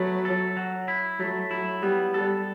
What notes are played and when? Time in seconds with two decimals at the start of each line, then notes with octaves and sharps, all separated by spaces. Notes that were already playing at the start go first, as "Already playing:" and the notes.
Already playing: F#3 A3 B3
0.25 A4
0.57 F#3
0.88 E4
1.19 F#3 A3
1.51 F#3 E4
1.82 G3 B3
2.14 G3 A4